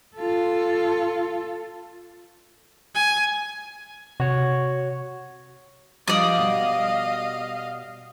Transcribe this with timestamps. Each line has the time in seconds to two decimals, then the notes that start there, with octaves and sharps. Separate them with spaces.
0.16 F4 A4
2.95 G#5
4.20 C3 F#4 C#5
6.08 F3 G3 D4 D5 D#5 F5 D#6
6.38 B2 G3